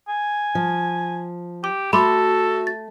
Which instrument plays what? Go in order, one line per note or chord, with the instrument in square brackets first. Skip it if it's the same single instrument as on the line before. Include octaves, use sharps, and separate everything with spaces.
[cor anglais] G#5
[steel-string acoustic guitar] F3
[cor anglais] G4 [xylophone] D6
[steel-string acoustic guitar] A3 [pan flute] F#4 [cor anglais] A4 [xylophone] B5 C6 D6
[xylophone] A6